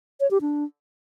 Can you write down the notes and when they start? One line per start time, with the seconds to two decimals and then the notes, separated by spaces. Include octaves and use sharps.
0.20 C#5
0.31 G4
0.41 D4